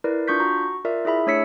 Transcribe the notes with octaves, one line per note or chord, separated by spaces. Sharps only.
E4 A#4 B4 D5
D4 F4 C#6 G6 B6
F#4 A#5 C#6
F4 A#4 D5 E5
E4 G#4 E5 B5
A3 D4 C#5 E6 B6 C#7